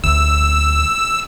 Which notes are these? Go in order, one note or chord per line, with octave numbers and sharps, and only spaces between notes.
D2 E6